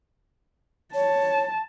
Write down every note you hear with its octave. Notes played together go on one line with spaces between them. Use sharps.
C#5 A5